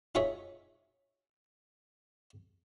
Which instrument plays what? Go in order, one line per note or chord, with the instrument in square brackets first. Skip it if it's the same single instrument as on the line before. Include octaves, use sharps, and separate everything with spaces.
[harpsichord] D#4 F4 G#4 C#5 E5